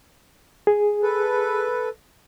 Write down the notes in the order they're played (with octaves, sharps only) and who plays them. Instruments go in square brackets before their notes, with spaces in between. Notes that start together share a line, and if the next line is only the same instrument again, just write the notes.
[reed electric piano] G#4
[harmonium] A4 B4